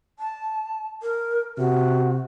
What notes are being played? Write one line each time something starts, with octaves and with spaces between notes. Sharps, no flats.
A5
A#4
C3 F#4